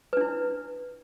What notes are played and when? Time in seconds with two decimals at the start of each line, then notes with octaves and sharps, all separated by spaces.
0.13 B4
0.17 D4
0.21 E4